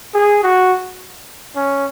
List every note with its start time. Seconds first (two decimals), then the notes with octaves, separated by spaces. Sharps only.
0.15 G#4
0.43 F#4
1.56 C#4